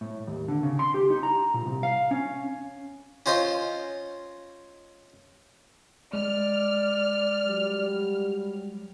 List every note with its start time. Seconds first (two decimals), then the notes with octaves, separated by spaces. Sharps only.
0.01 A2
0.27 D#2
0.48 D3
0.63 C#3
0.79 C6
0.94 G4
1.10 D#4
1.23 A#5
1.54 A#2
1.66 C2
1.83 F5
2.11 C#4
3.26 C#4 F4 C5 D#5 C6
6.13 G#3 D5 F6
7.47 F#3 G3